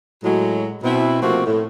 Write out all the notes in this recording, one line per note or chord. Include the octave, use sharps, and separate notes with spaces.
A2 F#3 G#3
B2 C4 E4
C3 F3 A3 A#3 C4 F#4
A2